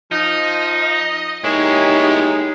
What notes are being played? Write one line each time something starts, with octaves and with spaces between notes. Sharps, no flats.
F3 D#4 D#5
G#3 A#3 D#4 E4 G4 G#4 C#5